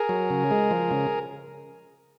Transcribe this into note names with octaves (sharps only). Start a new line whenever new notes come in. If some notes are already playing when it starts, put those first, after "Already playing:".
Already playing: G#4 A#4
F#3
C#3
G#3
F3
C#3